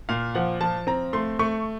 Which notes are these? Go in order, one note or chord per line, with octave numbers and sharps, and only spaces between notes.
A#2 F5
F3 F#5
F3 A5
C4 A#5
A3 C6
A3 C#6